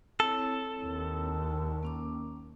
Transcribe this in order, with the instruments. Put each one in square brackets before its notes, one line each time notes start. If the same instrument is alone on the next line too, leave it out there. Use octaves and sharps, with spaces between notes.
[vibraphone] C4 E4 C#5 [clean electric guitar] A4
[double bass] D#2
[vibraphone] A#3 C#4 D6